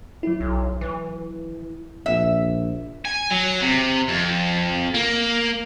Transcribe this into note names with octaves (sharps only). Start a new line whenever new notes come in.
F#3 E4
B1
E3
A#1 E5
G#5
F#3
C3
F2
A#3